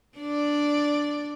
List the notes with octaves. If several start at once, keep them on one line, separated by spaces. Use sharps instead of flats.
D4 D5